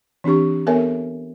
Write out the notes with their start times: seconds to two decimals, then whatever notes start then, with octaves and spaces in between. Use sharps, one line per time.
0.24 E3 C4 D4 G4 C#6
0.67 B3 A4 A#4 C#5 E5 G#5